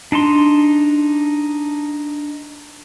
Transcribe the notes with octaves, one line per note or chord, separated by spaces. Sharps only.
D4 D#4 A5 C6